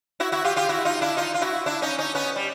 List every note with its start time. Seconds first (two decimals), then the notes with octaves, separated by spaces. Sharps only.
0.20 E4 F#4
0.32 E4 F#4
0.44 F4 G4
0.56 F4 G4
0.69 E4 F#4
0.85 D#4 F4
1.01 D4 E4
1.17 D#4 F4
1.34 F4
1.41 E4 F#4
1.66 D4 E4
1.82 C#4 D#4
1.98 C#4 D#4
2.15 B3 C#4
2.36 G3